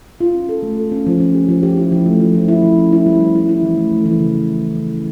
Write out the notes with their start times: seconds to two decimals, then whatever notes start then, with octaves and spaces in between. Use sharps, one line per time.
0.21 F4
0.34 C#4
0.49 A4
0.63 A3
0.77 A4
0.92 C#4
1.07 F3
1.20 C#4
1.35 G4
1.49 F3
1.63 G4
1.77 E4
1.92 F3
2.06 A3
2.20 F3
2.34 F3
2.48 E4
2.63 F3
2.78 C#4
2.92 E4
3.06 G3
3.20 G3
3.35 E4
3.49 E4
3.63 E3
3.77 A3
3.92 A3
4.05 E3
4.20 C#3